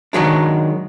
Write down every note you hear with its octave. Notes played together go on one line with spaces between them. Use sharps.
D#3 F#3 G#3 D4